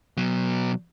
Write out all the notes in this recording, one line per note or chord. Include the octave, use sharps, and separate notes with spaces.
B2 F#3